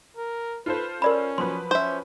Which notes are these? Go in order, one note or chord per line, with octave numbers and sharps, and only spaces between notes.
A#4
F4 A4 B4 C5
C#4 A#4 D5 B5
F3 F#3 B4 C6
C#4 C5 E5